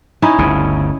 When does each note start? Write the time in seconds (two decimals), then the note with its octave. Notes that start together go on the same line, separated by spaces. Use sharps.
0.22 C#4 D#4 E4
0.38 G1 D2 C#3